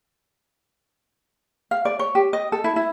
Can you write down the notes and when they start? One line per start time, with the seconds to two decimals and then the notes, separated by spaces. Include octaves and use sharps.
1.71 F5
1.85 D5
1.99 C#5
2.15 G4
2.33 D#5
2.52 A4
2.64 E4
2.76 E4